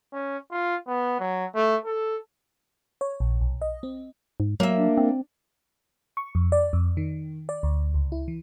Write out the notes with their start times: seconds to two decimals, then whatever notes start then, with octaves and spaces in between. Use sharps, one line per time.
0.13 C#4
0.51 F4
0.87 B3
1.20 F#3
1.55 A3
1.85 A4
3.01 C#5
3.20 A#1
3.41 B1
3.61 D#5
3.83 C4
4.40 G#2
4.60 F#3 A#3 E5
4.76 D4
4.98 C4
6.17 C#6
6.35 F2
6.52 D5
6.73 F2
6.97 D#3
7.49 D5
7.63 D2
7.94 C#2
8.12 E4
8.28 E3